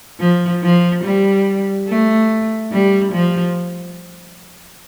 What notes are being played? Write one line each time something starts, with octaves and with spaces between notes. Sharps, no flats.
F3
F3
G3
A3
G3
F3